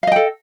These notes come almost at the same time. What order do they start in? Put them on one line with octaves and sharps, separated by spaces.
F5 D#5 G5 A4